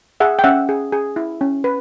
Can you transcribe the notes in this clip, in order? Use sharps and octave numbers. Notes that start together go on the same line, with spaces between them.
G#4 E5 F#5
G5
C#4 E5 F#5
G#4
G#4
E4
C#4
B4